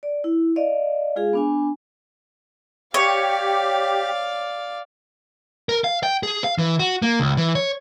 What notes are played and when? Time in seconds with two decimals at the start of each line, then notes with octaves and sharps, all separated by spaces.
0.03 D5
0.24 E4
0.56 D5 D#5 F5
1.16 G#3 F4 G#4 F5
1.33 B3 D4 G#5
2.94 G4 C#5 D5 F5
5.69 A#4
5.84 F5
6.03 G5
6.23 G#4
6.44 F5
6.58 E3
6.79 F#4
7.02 A#3
7.20 C#2
7.37 E3
7.55 C#5